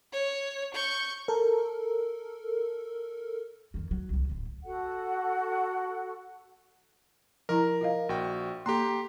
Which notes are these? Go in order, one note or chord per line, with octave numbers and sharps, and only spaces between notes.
C#5
C#6 G6
A4 A#4
F2 D#3
F#3
C2 D#3
D1 D3
F#4 A4 F#5
F3 E4 A#4 A#5
F4 D#5 F5
A#1 F#4 G5
A#3 G4 A4 A#5 C6